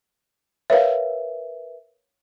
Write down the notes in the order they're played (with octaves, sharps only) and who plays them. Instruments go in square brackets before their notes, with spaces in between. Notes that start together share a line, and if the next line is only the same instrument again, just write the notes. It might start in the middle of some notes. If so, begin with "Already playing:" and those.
[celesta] A#4 B4 E5 [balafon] C#5 F5